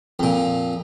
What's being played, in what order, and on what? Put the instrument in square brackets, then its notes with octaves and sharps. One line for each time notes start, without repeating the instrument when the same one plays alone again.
[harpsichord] F2 A#2